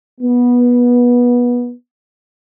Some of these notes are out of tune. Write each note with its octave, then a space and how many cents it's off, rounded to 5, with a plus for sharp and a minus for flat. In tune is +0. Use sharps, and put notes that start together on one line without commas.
B3 -20